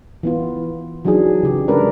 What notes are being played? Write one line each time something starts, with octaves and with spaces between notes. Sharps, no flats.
E3 B3 F4
E3 F#3 D4 D#4 G#4
C#3 G4
G#3 D4 A#4 B4 D5